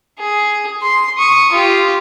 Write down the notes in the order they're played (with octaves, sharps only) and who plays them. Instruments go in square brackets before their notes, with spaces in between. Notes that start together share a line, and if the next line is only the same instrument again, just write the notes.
[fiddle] G#4
C6
C#6 D#6
F4 G4